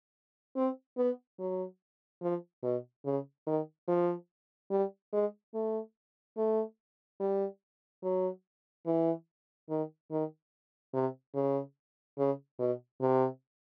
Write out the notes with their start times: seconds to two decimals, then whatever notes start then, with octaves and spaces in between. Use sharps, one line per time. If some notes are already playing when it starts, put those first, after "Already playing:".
0.56 C4
0.98 B3
1.39 F#3
2.22 F3
2.63 B2
3.05 C#3
3.47 D#3
3.88 F3
4.71 G3
5.13 G#3
5.54 A3
6.37 A3
7.20 G3
8.03 F#3
8.86 E3
9.70 D#3
10.11 D#3
10.94 C3
11.35 C#3
12.18 C#3
12.59 B2
13.01 C3